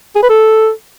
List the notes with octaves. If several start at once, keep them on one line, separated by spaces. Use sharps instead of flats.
G#4
B4
A4